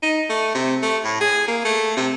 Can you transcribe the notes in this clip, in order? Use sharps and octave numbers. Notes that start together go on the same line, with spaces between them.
D#4
A3
C3
A3
A2
G#4
A#3
A3
C3